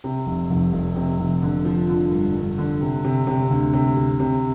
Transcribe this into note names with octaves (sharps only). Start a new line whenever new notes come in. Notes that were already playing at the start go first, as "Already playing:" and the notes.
C3
F1
F1
F1
C3
F1
D3
F3
D3
G2
G2
D3
C3
C3
C3
D2
C3
C3
C3